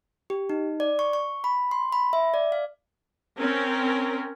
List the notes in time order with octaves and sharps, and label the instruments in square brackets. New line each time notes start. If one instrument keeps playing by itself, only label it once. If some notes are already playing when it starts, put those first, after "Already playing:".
[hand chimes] G4
D#4
D5
C#6
C#6
B5
C6
B5
E5
D5
F5
[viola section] C4 C#4 A#4